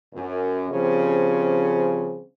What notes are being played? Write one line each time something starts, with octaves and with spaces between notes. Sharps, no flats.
F#2
C#3 F3 G3 C4 C#4